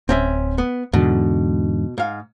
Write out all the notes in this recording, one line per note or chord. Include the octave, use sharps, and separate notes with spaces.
D1 C4 C#4 E5
B3
E2 G#2 B2 D3
G#2 F5